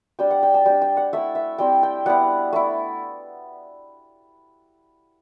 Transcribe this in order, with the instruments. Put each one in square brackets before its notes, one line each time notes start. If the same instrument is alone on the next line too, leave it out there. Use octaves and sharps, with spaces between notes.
[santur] G3 D4 G5
F#5
G5
A5
G3 D4 G5
G5
F#5
A3 E4 E5
E5
G3 C4 E4 G5
G5
G3 B3 E4 F#5
A3 E4